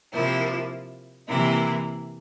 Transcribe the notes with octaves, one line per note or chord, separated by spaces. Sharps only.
C3 F3 A#3 E4
C3 E3 A#3 E4 A#4